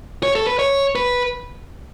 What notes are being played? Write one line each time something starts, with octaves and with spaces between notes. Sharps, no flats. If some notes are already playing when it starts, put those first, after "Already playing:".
C#5
A4
B4
C#5
B4